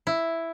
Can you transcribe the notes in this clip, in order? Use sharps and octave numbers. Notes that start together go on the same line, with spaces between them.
E4